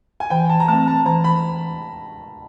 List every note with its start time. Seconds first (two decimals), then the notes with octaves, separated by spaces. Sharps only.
0.20 G#5
0.30 E3 G5
0.50 A5
0.60 A#5
0.68 A3 A5
0.73 C4
0.88 A5
1.06 E3 A#5
1.24 B5